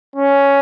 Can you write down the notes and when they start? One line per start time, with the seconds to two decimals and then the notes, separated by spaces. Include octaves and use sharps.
0.16 C#4